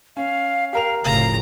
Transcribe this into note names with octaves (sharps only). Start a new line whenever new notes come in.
C#4 F5
G4 A#4 F5 F7
F1 A2 C#3 F5 A#5